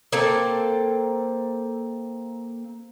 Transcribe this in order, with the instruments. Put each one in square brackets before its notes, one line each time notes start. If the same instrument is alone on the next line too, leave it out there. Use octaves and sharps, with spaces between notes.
[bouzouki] A#3 C4 A4